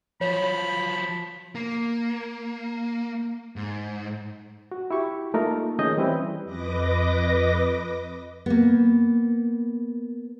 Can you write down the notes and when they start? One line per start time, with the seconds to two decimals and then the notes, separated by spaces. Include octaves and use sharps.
0.21 F3 F#3 C#5 B5
1.55 A#3
3.56 G#2
4.72 F#4
4.91 E4 G4 C#6
5.34 A3 A#3 D#4 F4 A#4
5.79 D#3 C#4 G#4 D#5 G6
5.97 E3 G3 C4 C#4 E4 B4
6.44 F2 B4 D#5 D6 A#6
8.46 A#3 B3